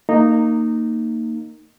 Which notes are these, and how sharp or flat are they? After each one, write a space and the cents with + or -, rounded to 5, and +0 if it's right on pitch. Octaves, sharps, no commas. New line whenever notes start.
A#3 -20 D#4 -10